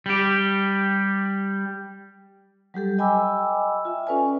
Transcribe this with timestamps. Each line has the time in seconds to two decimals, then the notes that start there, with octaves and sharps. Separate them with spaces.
0.06 G3 G4
2.74 F#3 G3 G4 A4
2.98 D#5 G5 G#5 B5 D6 E6
3.85 F4 E5
4.07 C#4 A4 B4 D5 G#5